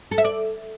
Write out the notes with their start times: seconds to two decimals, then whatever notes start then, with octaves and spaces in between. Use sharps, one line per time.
0.11 A4
0.18 E5
0.25 D5